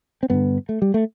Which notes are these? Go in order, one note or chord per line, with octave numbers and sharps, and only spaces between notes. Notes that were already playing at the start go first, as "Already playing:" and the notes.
C4
G2 D3 B3
A3
G3
A3